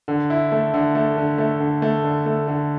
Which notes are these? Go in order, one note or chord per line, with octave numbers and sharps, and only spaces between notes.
D3
E4
A3
D3
A3
D3
A3
D3
A3
D3
A3
D3